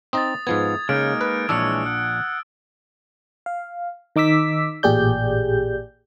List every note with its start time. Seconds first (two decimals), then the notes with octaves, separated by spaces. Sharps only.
0.13 C4 D#4 D#5 D#6 A6
0.47 G#2 F3 B3 G#6
0.89 C#3 G#3 A#3 D#4 F6 D7
1.21 B4 F#6
1.49 A#1 E3 G#3 D4 C#5 A5 D#6 E6
1.86 F#5
3.46 F5
4.16 D#3 D#4 D6 E6 B6
4.83 A1 A#2 G4 G#4 D5 G6